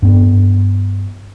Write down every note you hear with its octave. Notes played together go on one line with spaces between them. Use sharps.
G2 B3